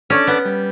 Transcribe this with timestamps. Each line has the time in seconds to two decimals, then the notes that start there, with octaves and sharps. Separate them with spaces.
0.10 C#4 D4 A4 D5
0.27 B3
0.45 G3